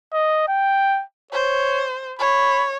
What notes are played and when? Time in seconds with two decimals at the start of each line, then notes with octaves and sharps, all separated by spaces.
0.13 D#5
0.48 G5
1.32 C5 C#5
2.19 C#5 B5